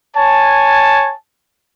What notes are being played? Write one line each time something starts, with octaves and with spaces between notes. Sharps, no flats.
C#5 G#5 A5